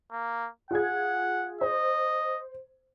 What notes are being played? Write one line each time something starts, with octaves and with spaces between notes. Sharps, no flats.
A#3
F4 G#4 F#5 G#6
C5 D#5